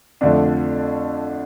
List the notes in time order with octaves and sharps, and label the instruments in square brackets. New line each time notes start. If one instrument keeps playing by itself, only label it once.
[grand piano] F2 D3 F3 A3 D4